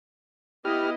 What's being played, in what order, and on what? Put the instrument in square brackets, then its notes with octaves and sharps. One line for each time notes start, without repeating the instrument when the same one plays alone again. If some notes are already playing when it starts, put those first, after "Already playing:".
[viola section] B3 E4 D#5 [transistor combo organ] G4 F6